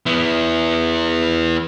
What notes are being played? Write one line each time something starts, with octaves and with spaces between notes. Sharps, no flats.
B3 E4